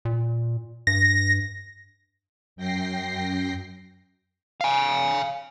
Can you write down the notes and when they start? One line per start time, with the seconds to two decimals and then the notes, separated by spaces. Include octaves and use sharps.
0.05 A#2
0.87 G2 A#6
2.56 F#2 G5 A#6 C7
4.61 F5 G#5